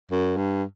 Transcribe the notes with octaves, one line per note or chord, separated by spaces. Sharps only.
F#2
G2